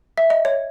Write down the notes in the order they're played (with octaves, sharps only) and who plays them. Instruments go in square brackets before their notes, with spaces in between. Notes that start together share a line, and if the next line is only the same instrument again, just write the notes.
[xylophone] E5
D#5
C#5